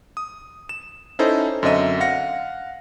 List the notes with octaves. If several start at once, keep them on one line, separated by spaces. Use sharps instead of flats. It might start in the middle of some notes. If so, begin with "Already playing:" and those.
D#6
E7
C#4 D#4 E4 A4 C5 D#5
F#2 D3 C4 D#5 E5 D#7
F5 F#5 A#6 C#7